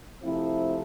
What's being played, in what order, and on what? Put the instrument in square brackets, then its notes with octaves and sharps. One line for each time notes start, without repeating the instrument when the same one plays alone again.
[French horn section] C3 F3 A3 C4 E4